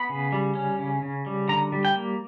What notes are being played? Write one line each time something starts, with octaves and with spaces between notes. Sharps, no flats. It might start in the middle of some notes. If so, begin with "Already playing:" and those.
Already playing: B3 B5
C#3
G3
C#4
C#3
C#3
G3
D3 A#5
G3
G5
A#3